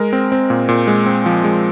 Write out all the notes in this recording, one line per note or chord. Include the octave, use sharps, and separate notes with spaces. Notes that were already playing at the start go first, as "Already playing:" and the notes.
Already playing: G#3 A#4
C4
C4
A#2
A#2
G#3
C4
F3
G#3